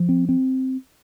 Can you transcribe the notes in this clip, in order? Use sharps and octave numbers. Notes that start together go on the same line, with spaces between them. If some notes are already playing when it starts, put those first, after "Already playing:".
Already playing: F3
C4
C4